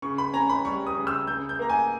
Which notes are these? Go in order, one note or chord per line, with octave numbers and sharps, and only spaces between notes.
C#3 C#6
B5
C#4 A#5
B5
G3 C#6
D#6
C#3
E6
C#3 G6
G6
A#3 A#5
G#5